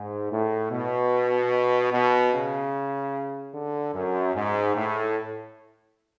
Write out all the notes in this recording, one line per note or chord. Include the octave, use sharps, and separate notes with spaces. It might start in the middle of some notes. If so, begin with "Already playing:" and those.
Already playing: G#2
A2
B2
B2
C#3
D3
F#2
G#2
A2